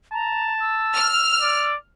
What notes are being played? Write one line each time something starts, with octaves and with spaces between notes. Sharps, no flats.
A5 A#5
E6
F6
D5